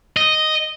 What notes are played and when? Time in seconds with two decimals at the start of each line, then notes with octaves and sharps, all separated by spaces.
0.17 D#5